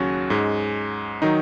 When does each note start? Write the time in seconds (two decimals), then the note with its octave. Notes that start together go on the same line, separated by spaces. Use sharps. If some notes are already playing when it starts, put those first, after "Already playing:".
Already playing: D#2 C#3 F#3 C#4 F#4
0.30 G#2 G#3
1.22 D#3 F#3 D#4